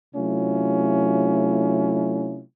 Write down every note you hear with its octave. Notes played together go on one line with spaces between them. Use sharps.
C3 F#3 A3 C#4 E4 F4